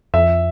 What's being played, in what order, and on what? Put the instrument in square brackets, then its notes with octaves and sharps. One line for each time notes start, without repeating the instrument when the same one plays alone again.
[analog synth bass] F2 [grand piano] E5